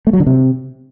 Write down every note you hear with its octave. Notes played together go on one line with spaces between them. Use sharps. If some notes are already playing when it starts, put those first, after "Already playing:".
A3
F#3
D3
C3